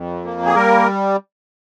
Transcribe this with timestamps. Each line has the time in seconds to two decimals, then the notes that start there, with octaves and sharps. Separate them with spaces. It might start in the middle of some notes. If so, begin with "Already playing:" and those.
Already playing: F2
0.24 A#3
0.45 G#4
0.55 G3 A#4